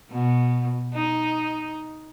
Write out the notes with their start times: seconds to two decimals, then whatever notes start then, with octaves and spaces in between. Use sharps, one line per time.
0.11 B2
0.94 D#4